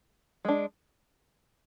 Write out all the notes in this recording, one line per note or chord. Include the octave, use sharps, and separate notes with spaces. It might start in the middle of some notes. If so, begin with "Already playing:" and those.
G#3 D4